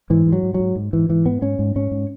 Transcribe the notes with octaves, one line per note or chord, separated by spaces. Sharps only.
G#2 E3
G#2
F#3
G#2
F#3
G#2
G#2
G#2 E3
G#2 E3
G#2 B3
G#2 C#4
G#2
G#2 C#4
G#2